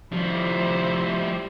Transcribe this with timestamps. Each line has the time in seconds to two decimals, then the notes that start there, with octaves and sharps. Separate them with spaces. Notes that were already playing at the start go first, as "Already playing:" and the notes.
0.12 F3 G3 E4 C5 E5